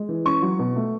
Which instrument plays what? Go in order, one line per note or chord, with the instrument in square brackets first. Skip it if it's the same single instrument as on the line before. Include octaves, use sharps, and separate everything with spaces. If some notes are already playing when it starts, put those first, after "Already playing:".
Already playing: [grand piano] G#3
E3
C#4 C#6
F#3
B2
A3